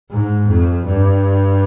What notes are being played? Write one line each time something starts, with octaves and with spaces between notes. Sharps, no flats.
G#2
F2
G2